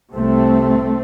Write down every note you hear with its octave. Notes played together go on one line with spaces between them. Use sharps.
C2 C3 A3 C4